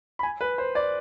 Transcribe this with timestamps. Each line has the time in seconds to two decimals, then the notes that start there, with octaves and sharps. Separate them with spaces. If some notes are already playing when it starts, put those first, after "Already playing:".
0.19 B5
0.23 G#5
0.41 B4
0.58 C5
0.75 D5